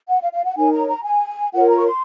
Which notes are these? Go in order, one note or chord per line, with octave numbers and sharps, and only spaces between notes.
F#5
F5
F5
F#5
D#4 A#4 C#5 G#5
A#5
A#5
G#5
F4 A#4 C#5 F#5
A#5
C#6
C6